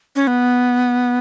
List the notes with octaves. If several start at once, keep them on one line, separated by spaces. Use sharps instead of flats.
C#4
B3